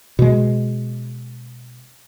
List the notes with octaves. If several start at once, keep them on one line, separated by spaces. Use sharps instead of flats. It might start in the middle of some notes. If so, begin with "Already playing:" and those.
B2 G#3